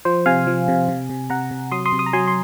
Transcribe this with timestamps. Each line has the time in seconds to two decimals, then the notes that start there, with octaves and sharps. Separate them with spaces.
0.05 F3 C5
0.26 C3 F5 G#5
0.47 F3
0.68 C3
0.88 C3
1.09 C3
1.30 C3 F#5 A#5
1.51 C3
1.71 F#3 C6 D#6
1.85 C6 D#6
1.92 C3
1.99 C6 D#6
2.06 A#5
2.13 F#3 G#5 C6
2.27 C6